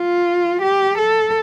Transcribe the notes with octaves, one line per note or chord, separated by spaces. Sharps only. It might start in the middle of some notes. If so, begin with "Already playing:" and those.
Already playing: F4
G4
A4